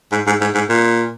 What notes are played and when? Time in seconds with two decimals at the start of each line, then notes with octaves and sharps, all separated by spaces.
0.12 G#2
0.27 G#2
0.41 G#2
0.55 G#2
0.69 A#2